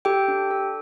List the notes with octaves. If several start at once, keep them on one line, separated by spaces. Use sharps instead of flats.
G4 A4 G5
D4
A4